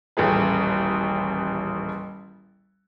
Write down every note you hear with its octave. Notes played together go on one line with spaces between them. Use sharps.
D#1 A1 A3 G#4 B4